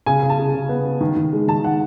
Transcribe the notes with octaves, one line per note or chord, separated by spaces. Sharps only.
C#3 G#5
C#3
A5
C#3
C#3
B3
C#3
D#3
D#3
G#3
D#3 A5
D#3 F#5